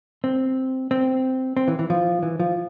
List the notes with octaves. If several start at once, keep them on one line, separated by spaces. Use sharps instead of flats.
C4
C4
C4
E3
E3
F3
E3
F3